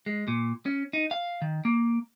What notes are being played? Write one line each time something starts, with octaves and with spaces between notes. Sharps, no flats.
G#3
A#2
C#4
D#4
F5
D#3
A#3